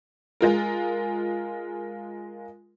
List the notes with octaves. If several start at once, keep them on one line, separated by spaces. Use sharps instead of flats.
G#3 F4 A#4